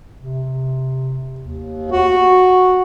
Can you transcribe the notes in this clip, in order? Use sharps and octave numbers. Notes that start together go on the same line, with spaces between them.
C3
D#2
F#4